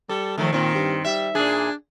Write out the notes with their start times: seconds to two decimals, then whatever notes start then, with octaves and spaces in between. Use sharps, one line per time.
0.09 G3 A4
0.38 D#3 F3 A3
0.53 A#2 D#3 C4
0.75 G2
1.05 G3 E5
1.35 A#2 D4 G#4